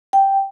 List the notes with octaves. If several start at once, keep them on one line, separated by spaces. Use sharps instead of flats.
G5